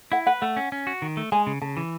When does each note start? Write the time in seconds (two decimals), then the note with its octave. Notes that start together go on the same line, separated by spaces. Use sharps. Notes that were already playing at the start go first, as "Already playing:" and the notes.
0.12 E4 F#5
0.26 B4 F#5
0.42 A3 F#5
0.57 C#4
0.72 C#4
0.87 F#4
1.02 D#3
1.17 A3
1.32 G#3 G#5
1.47 C#3
1.62 C#3 A5
1.77 E3